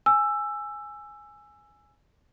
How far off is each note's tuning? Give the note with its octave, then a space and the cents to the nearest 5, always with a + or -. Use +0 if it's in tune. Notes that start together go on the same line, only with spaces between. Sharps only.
G#5 +0 E6 +15